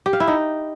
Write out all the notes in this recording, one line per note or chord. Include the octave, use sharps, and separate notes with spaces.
G4
F5
E4
D#4